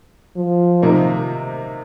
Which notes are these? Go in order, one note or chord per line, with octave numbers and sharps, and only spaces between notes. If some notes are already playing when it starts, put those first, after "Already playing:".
F3
C3 D#3 A#3 D#4